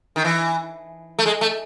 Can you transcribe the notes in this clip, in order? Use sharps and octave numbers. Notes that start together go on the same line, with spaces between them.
D#3
E3
A3
G#3
A3